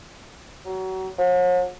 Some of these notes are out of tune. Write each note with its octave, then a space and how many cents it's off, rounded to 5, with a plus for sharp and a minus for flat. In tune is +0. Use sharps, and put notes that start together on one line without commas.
F#3 +30
F#3 -45